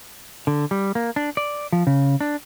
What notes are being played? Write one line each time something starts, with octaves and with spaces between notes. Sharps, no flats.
D3
G3
A#3
D4
D5
F3
C#3
D4